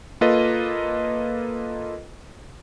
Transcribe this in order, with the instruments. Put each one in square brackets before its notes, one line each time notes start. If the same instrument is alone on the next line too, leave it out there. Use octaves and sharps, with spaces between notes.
[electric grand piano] A#3 F4 A4 B4 D#5